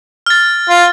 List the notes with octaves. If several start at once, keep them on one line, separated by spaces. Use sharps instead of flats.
F6 A6
F4